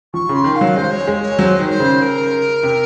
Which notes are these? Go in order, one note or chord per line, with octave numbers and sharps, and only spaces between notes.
F3 C#6
C#3 C6
D#3
F5
F#3
G#3 C5
C#5
G#3
C#5
F#3 C5
D#3
C5
C#3
A#4
C3